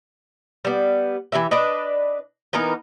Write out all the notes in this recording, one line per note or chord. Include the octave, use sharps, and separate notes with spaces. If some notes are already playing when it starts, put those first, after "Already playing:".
G3 B3
E3 A#3 G4 E5
D4 B4 D5 D#5
E3 B3 D#4 A#4